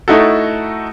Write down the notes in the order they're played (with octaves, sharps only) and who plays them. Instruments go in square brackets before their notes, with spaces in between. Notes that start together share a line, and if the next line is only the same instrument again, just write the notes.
[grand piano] A3 D#4 E4 F#4 A4